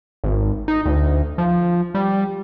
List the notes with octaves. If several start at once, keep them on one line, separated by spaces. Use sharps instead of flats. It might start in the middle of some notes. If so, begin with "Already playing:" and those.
G#1
D#4
D2
F3
G3